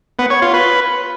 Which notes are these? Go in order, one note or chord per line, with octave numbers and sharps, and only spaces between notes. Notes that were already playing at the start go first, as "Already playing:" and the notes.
B3
C#5
F4
B4